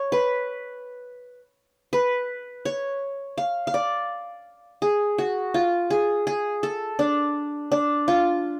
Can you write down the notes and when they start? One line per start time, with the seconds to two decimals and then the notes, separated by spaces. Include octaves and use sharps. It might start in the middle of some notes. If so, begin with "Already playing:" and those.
Already playing: C#5
0.12 B4
1.93 B4
2.65 C#5
3.38 F5
3.67 F5
3.74 D5
4.82 G#4
5.18 F#4
5.54 F4
5.90 G#4
6.27 G#4
6.63 A4
6.99 D4
7.72 D4
8.08 F4